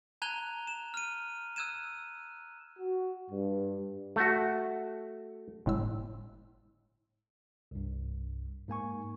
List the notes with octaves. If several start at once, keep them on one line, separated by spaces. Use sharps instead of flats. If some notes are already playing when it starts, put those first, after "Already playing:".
A5 A#5 F#6 G#6 F7 G7
E7
F6 D#7
E6 F#6 G#6 D#7 E7
F#4
G2
A3 F#4
G1 A2 G#3 E6
C2 G2
G#2 A#3 G#5 C#6